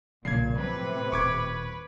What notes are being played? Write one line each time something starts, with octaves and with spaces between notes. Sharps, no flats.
B1 A#2 C#3 F3 G3 G#6 C7
A2 C3 F3 F#3 B4
D#1 C#6 D6 G#6